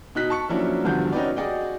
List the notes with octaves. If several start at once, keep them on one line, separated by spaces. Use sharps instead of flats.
B2 D#4 F#6 B6
A5 C#6 C#7
F3 F#3 A#3 C#4 D4 E4
E2 G2 D3 F3 F#4 G6
C#4 D#4 F#4 G4 B4 D5
F#4 G#4 D5 D#5 F#5 G5